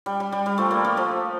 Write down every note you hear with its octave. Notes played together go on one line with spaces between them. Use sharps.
G3
G3
G3
G3
F3 A3
G3 A#3
F3 A3
F3 A3